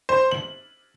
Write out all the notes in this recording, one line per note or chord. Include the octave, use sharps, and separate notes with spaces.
C5
F#7